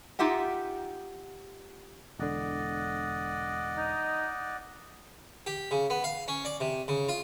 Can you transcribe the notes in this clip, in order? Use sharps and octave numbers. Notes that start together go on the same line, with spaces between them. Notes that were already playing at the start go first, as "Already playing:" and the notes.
D#4 F4 G4 E5 F#5
E1 D3 D5 D#5 F#5
D#4
G4
C#3
B3
F5
C#4
D5
C3
C#3
F4